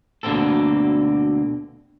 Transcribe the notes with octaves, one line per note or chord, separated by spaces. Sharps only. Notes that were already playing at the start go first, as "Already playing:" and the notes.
D2 B2 D3 A#3 C4 A4